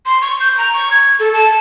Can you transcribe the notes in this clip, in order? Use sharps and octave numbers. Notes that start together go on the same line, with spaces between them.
C6
C#6
G6
A#5
C#6
G#6
A4
A5